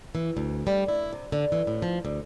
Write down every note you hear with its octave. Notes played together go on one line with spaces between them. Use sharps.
E3
D2
G3
E4
C3
D3
E3
A2
F3
D2